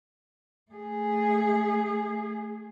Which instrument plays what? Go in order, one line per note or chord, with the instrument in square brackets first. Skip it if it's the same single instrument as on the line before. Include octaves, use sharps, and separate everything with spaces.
[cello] A3 G#4